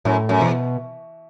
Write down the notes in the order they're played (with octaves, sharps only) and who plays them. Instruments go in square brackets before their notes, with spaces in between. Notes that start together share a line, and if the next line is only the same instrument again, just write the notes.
[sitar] F#2 [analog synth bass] A2
[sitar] F#2
[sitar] E2 [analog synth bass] B2